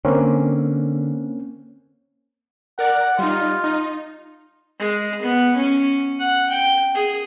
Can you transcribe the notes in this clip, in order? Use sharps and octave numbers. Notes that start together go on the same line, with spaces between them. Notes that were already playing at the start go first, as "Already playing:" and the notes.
D3 A#3 C4 C#4
A#4 D5 F#5
G3 D#4 F4
D#4
G#3
B3
C#4
F#5
G5
G#4